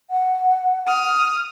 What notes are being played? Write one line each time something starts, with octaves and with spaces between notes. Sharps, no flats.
F#5
D#6 F6